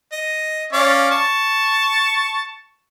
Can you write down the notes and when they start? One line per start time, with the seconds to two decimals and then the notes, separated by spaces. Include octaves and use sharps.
0.12 D#5
0.73 C#4 D5 F5
1.11 A5 C#6